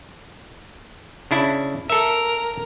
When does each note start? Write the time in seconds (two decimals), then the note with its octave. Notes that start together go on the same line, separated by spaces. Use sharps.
1.31 C#3 D4 E4
1.90 A4 A#4 E5